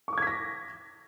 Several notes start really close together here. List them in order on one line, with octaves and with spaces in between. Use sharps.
C#6 D6 G#6 B6 A#6